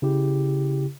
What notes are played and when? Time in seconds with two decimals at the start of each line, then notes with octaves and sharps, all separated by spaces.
0.02 C#3 E4 G4